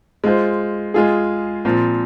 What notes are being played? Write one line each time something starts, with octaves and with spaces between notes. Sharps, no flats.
G#3 F4 C5
G#3 F4 G#4
A#2 F3 C4